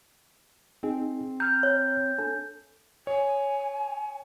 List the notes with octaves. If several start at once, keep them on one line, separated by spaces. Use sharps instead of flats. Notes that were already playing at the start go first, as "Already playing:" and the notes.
C4 D#4 G#4
A#5 F6 G6
C#5
D4 A4
C#5 G#5